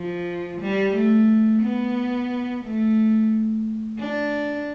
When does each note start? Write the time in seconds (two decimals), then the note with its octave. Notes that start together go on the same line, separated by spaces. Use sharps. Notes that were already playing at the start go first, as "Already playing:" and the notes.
Already playing: F3
0.61 G3
0.95 A3
1.63 B3
2.64 A3
4.00 D4